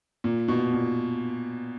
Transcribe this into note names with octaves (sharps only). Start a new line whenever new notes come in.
A#2
B2
A#2